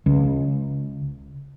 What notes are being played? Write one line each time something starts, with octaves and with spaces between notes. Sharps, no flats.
C#2